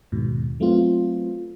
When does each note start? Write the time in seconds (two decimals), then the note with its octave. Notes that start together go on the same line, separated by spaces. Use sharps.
0.12 D#2 G#2 B2
0.60 F#3 A3 B3 C4 F4